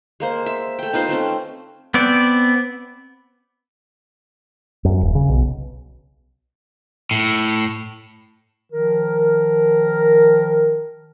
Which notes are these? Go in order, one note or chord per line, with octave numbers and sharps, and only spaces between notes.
G#3 A#3 C5
E5
A3 G5
D#4 F4 B4 C5
A3 C4 C#4
B3 C4 D5
F#2
D#1
C#3
B1
A2
D#3 F3 A#4